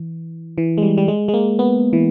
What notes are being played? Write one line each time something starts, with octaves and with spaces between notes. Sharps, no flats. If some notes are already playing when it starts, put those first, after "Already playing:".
Already playing: E3
E3
G#3
G3
G3
G#3
G#3
A#3
B3
E3